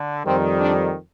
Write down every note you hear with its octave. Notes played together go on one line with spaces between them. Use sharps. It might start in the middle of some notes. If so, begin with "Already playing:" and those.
Already playing: D3
F2 D#3 G3 C4
D4